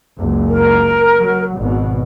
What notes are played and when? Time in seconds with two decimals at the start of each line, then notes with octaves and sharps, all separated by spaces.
0.19 F#1 C#2
0.49 A#4
1.21 F#3
1.56 G#1 B2